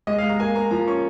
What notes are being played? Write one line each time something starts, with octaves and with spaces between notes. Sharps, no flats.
G#3 D#5
G#3 F5
A#5
A#3 G#5
A#3 A#5
F3 A#5
C#4 C#6